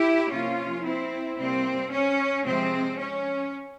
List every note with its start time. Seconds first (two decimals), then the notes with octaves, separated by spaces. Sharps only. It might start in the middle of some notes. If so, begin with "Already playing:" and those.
Already playing: E4 G4
0.31 C3 F3 A#3 C#4 F4
0.84 C4 E4
1.38 C3 G3 A#3 C4
1.91 C#4
2.44 C3 F3 G#3 C4
2.98 C#4